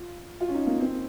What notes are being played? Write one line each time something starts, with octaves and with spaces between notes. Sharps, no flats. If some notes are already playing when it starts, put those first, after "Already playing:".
Already playing: F4
F4
C#4
D#4
A#3
C4